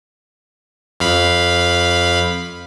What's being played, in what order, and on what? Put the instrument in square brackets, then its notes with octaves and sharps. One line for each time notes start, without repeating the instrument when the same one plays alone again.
[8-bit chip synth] F2 F5 B5